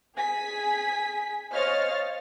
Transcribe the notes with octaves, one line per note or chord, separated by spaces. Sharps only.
G#4 G#5 B6
C5 C#5 D#5 F5 F6 A6